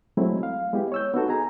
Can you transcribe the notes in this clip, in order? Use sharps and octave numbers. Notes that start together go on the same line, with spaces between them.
F#3 G#3 A3 C4 E4
F5
G#3 B3 E4 G4
C#5 E6 G6
B3 D#4 F#4 A4
G#4 G#5 A#5